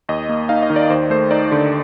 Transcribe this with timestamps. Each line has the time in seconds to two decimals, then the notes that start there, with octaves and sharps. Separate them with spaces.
0.09 D#2 D#5
0.29 A#3
0.49 D#4 F5
0.63 D#5
0.70 D#3
0.76 D5
0.90 D#2 C5
1.10 A3 C5
1.31 D#4 D5
1.52 D3